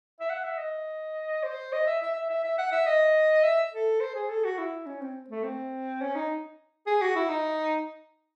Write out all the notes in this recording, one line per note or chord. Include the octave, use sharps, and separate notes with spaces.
E5
F#5
E5
D#5
C5
D#5
E5
E5
E5
E5
E5
F#5
E5
D#5
E5
A4
C5
G#4
A4
F#4
E4
C#4
C4
A3
C4
C#4
D#4
G#4
F#4
E4
D#4